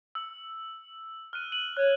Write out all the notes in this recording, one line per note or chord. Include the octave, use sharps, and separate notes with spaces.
E6
F6 F#6 D#7
D#7 F#7
C#5 F#6